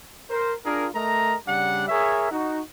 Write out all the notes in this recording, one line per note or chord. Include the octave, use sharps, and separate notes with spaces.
A#4 C5
D4 F4 G#4 A#4
A3 A#4 D#5 A#5
C#3 G3 D4 F#5
G#4 A#4 C#5 E5
D#4 F#4